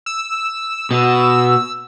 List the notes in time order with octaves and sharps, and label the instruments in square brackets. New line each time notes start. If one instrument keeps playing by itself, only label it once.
[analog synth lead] E6
[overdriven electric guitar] B2